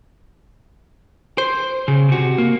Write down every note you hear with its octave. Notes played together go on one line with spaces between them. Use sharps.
C5
C#3
C3 F#4
A#3